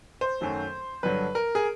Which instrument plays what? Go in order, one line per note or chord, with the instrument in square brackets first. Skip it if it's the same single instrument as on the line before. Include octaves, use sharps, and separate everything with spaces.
[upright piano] C5
F#2 D#3 F#3 A3
G2 D3 F#3 B4
A#4
G#4